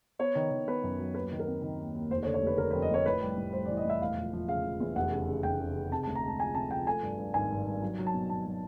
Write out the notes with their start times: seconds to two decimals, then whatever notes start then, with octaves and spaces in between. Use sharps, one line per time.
0.19 B3 C#5
0.35 D#3
0.51 D#3
0.68 B3 B4
0.83 F#2
0.99 F#3
1.14 D#2 B4
1.32 D#3
1.39 A#4
1.47 C4
1.62 D#3
1.79 D#2
1.94 D#2
2.10 F1 C5
2.23 C#5
2.26 D3
2.34 C#5
2.42 F1 B4
2.57 D3 A#4
2.71 B4
2.73 F2
2.82 D#5
2.90 F1 C#5
3.06 A2 B4
3.22 G3
3.37 A2
3.53 G3 C5
3.66 D5
3.69 E3
3.77 D#5
3.85 A2 E5
4.01 E1 F5
4.17 F3
4.33 F3
4.48 C#3 F5
4.64 F3
4.80 E2
4.96 F1 F#5
5.12 C#3
5.28 C#3
5.43 F1 G5
5.60 C#3
5.76 C#3
5.91 C3 A5
6.03 A5
6.07 D2
6.15 A#5
6.23 G#3
6.28 A5
6.40 F3 G#5
6.55 C3 A5
6.71 F3 G5
6.87 A3 G#5
7.03 G2
7.18 G2
7.34 G#1 G#5
7.51 G2
7.67 G2
7.82 F#3
7.98 F#3
8.07 A5
8.14 B2
8.30 B2 A5
8.46 F#3